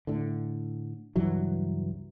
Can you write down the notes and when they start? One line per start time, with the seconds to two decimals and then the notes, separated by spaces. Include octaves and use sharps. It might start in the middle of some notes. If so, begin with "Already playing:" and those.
0.07 A2 D3
1.16 C#2 G2 E3 F#3